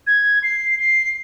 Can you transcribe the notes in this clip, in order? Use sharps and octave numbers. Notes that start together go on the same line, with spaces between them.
G#6
C7
C7